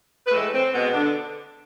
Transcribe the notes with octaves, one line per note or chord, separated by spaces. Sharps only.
B4
A2 E3 G#3 A3 A4
C4
B2 G#3 B3
D3 D4